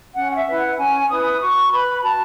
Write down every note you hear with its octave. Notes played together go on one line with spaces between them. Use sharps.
C#4 F#5
F#5
E5
E4 B4
F#5
C#4 G#5
E4 B4 D#6
F#4 C#6
B4 B5
F#4 A5